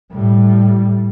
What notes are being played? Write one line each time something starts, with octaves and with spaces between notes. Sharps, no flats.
A2 G3